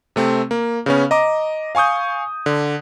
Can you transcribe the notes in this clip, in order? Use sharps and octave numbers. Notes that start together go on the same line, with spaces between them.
C3 A3 C4
A#3
C#3 B3 C#4
D#5 A#5 D6
F5 G#5 C#6 D#6 G6
D3